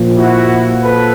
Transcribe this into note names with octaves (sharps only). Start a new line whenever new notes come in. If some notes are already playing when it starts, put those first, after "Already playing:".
Already playing: A#2 F3
E4 F#4
A4 B4